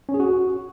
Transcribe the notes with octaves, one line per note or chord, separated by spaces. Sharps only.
C#4
G#4
F#4